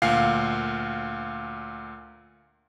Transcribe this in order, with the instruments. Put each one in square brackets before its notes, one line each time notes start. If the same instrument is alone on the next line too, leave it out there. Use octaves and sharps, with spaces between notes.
[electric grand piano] D2 A#2 F5 C7